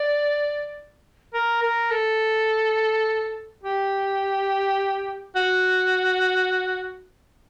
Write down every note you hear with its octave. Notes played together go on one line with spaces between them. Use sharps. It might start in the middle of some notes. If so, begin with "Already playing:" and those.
Already playing: D5
A#4
A#4
A4
G4
F#4